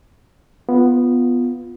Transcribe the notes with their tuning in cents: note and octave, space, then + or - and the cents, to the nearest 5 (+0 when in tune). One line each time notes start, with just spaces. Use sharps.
B3 +0 F4 +0